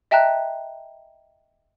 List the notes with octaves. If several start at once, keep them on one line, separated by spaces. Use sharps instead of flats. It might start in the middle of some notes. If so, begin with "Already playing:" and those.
D#5 E5 G5 A5 A#5 F#6